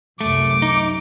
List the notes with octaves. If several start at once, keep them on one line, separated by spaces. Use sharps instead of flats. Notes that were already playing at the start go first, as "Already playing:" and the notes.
C2 F#2 A3 D6
D#4